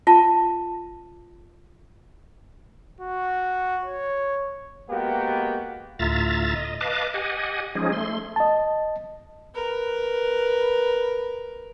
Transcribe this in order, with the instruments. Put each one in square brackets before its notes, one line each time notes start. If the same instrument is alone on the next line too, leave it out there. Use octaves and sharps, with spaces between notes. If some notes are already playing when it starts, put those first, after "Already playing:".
[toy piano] F4 A5
[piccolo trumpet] F#4
C#5
[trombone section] G#3 A#3 B3 F#4 G4
[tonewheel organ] D2 A2 F4 E5 A#5 A6
D#5
B4 D#5 F5 A5 D6
G4 D#5 F#5 G#5
F3 G#3 C#4 D#4 G#4
A3 C6
[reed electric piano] D#5 A5
[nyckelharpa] A#4 B4